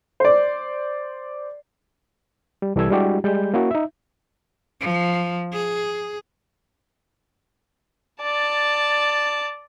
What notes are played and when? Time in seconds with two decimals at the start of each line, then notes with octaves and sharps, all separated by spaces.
0.20 C5 D5
2.62 G3
2.76 C2 E3 G3 A4 E6 G#6
2.90 G3 G#3 D4 E4 F#4 G4
3.24 G3 G#3 G6
3.54 A#3 C#4 E4 F#4
3.71 D#4 E5
4.80 F3
5.53 G#4
8.22 D5 A5